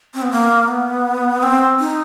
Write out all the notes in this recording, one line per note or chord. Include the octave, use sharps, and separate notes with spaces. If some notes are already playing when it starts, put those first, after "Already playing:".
C4
B3
A#3
B3
C4
D#4